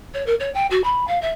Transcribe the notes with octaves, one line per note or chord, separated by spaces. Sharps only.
C#5
A#4
C#5
G5
F#4
B5
F5
E5